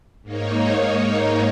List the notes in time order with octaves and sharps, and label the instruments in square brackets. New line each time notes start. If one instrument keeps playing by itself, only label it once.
[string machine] G#2 A#3 D#4 C#5